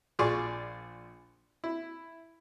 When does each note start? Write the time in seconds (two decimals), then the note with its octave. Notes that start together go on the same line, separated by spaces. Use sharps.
0.19 A#1 F4 G#4 D5 C#6
1.64 E4